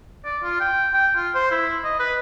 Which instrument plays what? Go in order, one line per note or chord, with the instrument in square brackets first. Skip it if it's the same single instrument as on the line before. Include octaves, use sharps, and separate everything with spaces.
[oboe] D5
F4
G5
G5
F4
C5
E4
D#5
B4